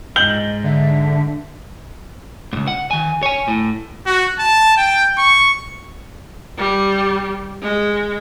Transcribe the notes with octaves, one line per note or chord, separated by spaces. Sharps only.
G#2 D#5 G6 F#7 G7
D3 E5
C#2 G#2
F#5
D#3 G#5
C#5 G#5
A2
F#4
A5
G5
C#6
G3
G#3